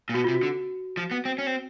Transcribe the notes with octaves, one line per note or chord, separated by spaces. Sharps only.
A#2
B2 F#4
C3 F4
F#4
D3
F3
B3
C4
C#4
C4